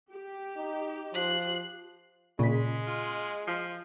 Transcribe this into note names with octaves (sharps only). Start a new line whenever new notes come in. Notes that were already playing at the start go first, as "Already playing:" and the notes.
G4
D#4
F3 F#6 C7
A#2 C#3 G#3 B6
F4
F3